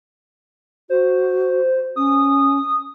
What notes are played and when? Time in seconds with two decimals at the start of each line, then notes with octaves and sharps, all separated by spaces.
0.90 F#4 C5
1.96 C#4 D#6